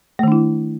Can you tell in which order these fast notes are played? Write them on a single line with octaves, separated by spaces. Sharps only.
A3 D#3 D4 E4